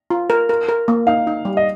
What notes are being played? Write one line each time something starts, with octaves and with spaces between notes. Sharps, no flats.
F4
A#4
A#4
A#4
A#3
D#4 F5
D#4
G3
D#5